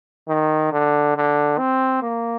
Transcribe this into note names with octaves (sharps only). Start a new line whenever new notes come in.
D#3
D3
D3
C4
A#3